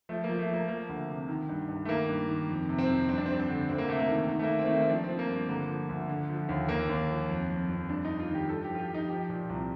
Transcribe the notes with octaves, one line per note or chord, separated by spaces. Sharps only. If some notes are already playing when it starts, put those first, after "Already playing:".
F3 A3
A#3
F3
A3
F3 A#3
F3 A#3
D2
C3
D#3
G2
G2
A3
D#3 A#3
G2
D#3
F2
C3
C4
F2
G2 C4
D4
C4
G2
C4
D3
D2 C4
A#3
C3 A3
A#3
D#3
D#3
A3
A#3
D#3
C4
D#3 A3
A#3
C4
F3 D4
C4
F3
A#3
G2
D3 A#3
F3
D2
D3
F3
D#2
D#2 A#3
D#2
F3
F2
F2
F2
G2 D4
D#4
G2
F4
D#3 G4
G2 A4
G4
F3
F4
G4
F3
D#4
F3 G4
A#2
C2